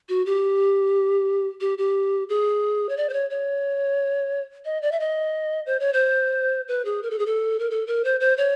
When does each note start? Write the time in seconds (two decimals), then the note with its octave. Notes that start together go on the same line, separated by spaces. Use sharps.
0.09 F#4
0.26 G4
1.61 G4
1.78 G4
2.29 G#4
2.89 C#5
2.97 D5
3.09 C5
3.13 C#5
3.30 C#5
4.65 D#5
4.82 D5
4.92 E5
5.00 D#5
5.66 C5
5.80 C#5
5.93 C5
6.68 B4
6.85 G#4
7.03 A#4
7.10 A4
7.19 G#4
7.26 A4
7.60 A#4
7.71 A4
7.87 A#4
8.04 C5
8.20 C5
8.37 C#5